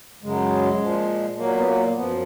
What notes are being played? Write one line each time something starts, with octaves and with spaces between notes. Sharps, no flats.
F#2 C#3 F#3 G#3
A#2 F3
A#2 F#3 A#3
B3
A#3
F#2 F3 B3